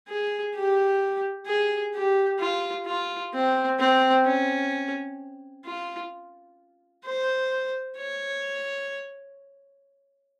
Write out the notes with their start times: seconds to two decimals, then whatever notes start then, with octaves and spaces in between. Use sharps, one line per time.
0.08 G#4
0.54 G4
1.47 G#4
1.94 G4
2.39 F4
2.86 F4
3.34 C4
3.79 C4
4.25 C#4
5.65 F4
7.05 C5
7.97 C#5